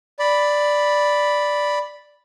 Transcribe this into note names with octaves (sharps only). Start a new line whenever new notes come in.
D5 B5